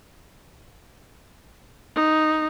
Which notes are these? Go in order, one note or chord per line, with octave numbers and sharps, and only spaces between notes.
D#4